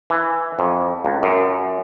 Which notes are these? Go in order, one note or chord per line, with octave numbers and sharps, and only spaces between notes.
E3
F2
C#2
F#2